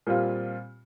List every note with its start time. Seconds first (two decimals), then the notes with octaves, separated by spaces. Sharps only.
0.07 A#2 G3 C4 F4